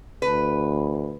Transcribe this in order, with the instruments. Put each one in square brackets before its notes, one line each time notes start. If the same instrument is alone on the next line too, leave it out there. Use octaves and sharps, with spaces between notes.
[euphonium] D2 [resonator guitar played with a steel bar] B4